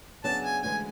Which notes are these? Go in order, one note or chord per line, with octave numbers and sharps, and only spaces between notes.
C#3 F#3 B3 D4 G#4 A5
G#5
D2 C#3 E3 G#3 G#5